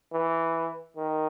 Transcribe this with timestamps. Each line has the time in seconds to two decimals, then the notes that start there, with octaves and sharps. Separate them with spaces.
0.13 E3
0.97 D#3